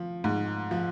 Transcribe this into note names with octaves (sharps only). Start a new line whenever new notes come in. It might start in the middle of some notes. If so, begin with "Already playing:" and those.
Already playing: F3
G#2
F3